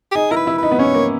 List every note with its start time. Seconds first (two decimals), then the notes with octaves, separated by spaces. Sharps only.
0.12 G4
0.15 D#4 G#4
0.31 E4 A#4
0.36 B4
0.47 E4
0.58 D#4 B4
0.71 B3
0.79 C#4 C#5
0.94 A#3